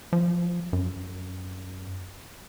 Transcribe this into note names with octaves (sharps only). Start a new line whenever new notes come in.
F3
F#2